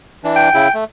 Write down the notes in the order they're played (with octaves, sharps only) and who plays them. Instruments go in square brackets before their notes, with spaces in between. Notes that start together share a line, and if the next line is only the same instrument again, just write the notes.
[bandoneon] E3 D4
[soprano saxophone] G5
[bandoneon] C#3 E4
A3